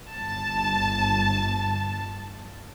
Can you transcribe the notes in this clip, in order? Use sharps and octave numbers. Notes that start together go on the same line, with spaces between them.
G1 A5